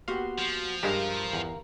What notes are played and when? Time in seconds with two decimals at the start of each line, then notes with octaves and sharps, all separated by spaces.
0.08 A#3 B3 F#4 G4 F5 C6
0.39 F3
0.83 G2 G#3 D4 G4 A#4 F5 A#5
1.33 E2